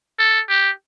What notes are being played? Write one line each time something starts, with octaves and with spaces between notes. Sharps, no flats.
A4
G4